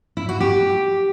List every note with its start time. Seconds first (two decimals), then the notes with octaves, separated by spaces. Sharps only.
0.17 E4
0.29 F#4
0.40 G4